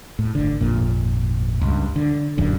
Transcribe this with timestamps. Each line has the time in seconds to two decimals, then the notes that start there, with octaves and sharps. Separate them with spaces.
0.19 A2
0.35 G1 D3
0.61 G#1 F2 A#2
1.61 C#2 G2
1.96 D3
2.38 D1 B1 F#2 D3